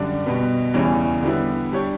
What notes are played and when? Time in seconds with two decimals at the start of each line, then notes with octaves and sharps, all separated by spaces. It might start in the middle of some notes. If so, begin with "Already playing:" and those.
Already playing: F#2 D3 G3 D4
0.26 B2 G3 B3
0.74 E2 C#3 E3 G3 C#4
1.23 D3 G3 B3 E4
1.72 G3 D4 G4 C#5